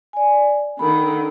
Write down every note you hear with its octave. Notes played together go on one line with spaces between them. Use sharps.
D5 G#5
D3 D#3 B5